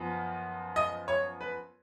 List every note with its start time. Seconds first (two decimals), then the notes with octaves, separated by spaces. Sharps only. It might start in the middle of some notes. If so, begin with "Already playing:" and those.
Already playing: F#2 F3 B3
0.76 D#5
1.08 C#5
1.41 B4